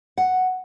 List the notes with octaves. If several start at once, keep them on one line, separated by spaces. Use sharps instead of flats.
F#5